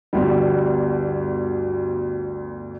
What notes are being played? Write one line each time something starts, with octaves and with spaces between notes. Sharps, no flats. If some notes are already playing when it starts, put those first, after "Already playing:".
G1 D2 G3